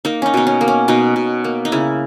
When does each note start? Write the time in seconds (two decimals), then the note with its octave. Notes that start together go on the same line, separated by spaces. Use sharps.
0.05 A#3 D#4
0.22 C#4 D#4
0.34 B2 D#4
0.47 C#4
0.61 A#3
0.68 C#4
0.88 B2 D#4
1.16 B2
1.44 A#3
1.65 D#4
1.72 C#3 E4